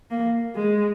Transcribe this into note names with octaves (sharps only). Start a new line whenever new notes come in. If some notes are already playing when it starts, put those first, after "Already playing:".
A#3
G#3